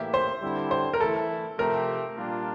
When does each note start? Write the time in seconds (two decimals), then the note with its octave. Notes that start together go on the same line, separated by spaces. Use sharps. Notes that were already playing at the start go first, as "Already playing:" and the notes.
Already playing: A2 E3 A#3 E4 G4 E5
0.14 C5
0.42 D3 G3 C4 E4
0.71 C5
0.93 A#4
1.00 E3 A3 E4 A4
1.58 C3 F3 A3 C4 G4 A#4
2.16 A#2 G3 A#3 D4 F4